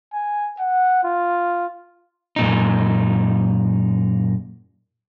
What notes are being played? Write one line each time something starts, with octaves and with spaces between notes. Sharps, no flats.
G#5
F#5
F4
F#2 A#2 D#4